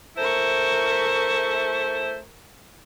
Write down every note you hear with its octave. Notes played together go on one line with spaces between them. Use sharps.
A3 E4 A#4 C5 C#6